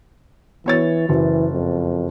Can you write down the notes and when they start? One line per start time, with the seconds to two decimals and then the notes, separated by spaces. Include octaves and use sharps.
0.66 E3 B3 C#5 A6
1.09 F#1 E3
1.53 F2